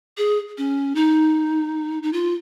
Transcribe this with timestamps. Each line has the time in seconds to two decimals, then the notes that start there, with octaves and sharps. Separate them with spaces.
0.18 G#4
0.58 C#4
0.95 D#4
2.03 D#4
2.13 F4